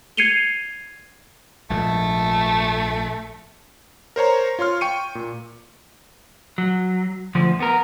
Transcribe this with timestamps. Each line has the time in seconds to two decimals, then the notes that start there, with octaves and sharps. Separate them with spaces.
0.17 G#6 C7 C#7 D#7 F7 G7
1.70 A#1 G#2 F3 A3
4.16 A#4 C5 C#5 A#5
4.59 F4 C#5 C6 F6
4.81 G5 C#6 C#7 D#7
5.15 A#2
6.58 F#3
7.35 D2 F3
7.60 B3 A#4